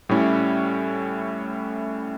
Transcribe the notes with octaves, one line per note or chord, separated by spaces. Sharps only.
A2 G3 C#4 E4